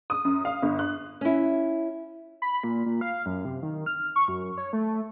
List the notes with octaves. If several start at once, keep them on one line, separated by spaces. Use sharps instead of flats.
D#6
F#2
F5
G1
F#6
C#4 E4
B5
A#2
A#2
F5
F#2
C3
D#3
F6
C#6
F#2
C#5
A3